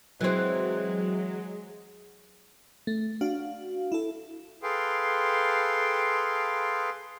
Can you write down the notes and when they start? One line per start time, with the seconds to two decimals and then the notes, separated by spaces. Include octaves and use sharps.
0.21 E3 F#3 G#3 C4
2.87 A3
3.21 D4 F#4 F5
3.92 E4 A4
4.63 G#4 A4 B4 F5 G5 C6